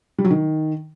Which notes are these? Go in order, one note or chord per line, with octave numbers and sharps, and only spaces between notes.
G3
F#3
D#3